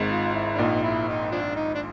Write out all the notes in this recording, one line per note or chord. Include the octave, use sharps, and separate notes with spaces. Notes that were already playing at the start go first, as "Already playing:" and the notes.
Already playing: G#1 G#2
F4
E4
D4
A#1 A#2 D#4
E4
D#4
F3 D4
D#4
D4